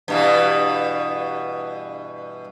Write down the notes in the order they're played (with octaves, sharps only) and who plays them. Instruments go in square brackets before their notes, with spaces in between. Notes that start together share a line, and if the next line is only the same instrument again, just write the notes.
[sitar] G2 B2 E3